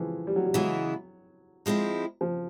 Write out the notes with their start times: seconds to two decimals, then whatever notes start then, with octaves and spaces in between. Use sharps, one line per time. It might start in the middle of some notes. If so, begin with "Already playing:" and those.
Already playing: E3 F3 G#3
0.27 G3
0.36 F#3
0.45 G3
0.54 C#3 E3 F#3 G#3 B3 E4
1.66 F3 G#3 C4 E4
2.21 F3